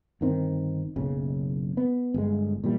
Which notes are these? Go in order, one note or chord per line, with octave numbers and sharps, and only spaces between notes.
G1 D#3 C4
F#1 B1 C#3
B3
G1 G#3
A#2 E3 G3